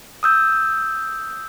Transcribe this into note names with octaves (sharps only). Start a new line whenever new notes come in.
D#6 E6 G6